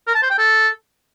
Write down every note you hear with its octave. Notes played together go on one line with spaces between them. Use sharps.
A#4
A5
C5
G5
A4